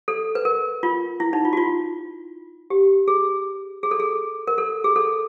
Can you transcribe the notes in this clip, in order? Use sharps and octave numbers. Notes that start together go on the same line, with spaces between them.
A4
B4
A#4
F4
E4
D#4
F4
F#4
F4
G4
G#4
G#4
A4
G#4
A#4
A4
G#4
A4